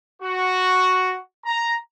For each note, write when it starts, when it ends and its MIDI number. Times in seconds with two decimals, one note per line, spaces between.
0.22 1.15 66
1.45 1.74 82